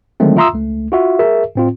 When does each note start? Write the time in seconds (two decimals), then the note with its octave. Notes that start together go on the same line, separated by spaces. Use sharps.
0.20 D3 D#3 F#3 G#3 A3 C4
0.37 F4 E5 A#5 C6 D#6 E6
0.53 C#2 A3
0.92 F4 F#4 E5
1.19 G#4 A#4 E5
1.55 A2 C4 F4